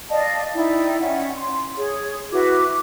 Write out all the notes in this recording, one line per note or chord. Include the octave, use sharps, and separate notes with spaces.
D5 D#5 F5 A5
D#4 E4 D5 G5
C#4 E5 F#5
C6
G#4 C#5
E4 F#4 B4 D6